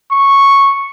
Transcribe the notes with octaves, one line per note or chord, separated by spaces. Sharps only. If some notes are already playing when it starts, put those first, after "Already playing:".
C#6